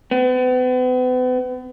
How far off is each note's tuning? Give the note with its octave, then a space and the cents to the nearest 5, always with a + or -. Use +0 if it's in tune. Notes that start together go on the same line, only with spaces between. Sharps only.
B3 +40